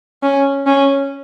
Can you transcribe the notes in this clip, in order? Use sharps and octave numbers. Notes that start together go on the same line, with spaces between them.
C#4
C#4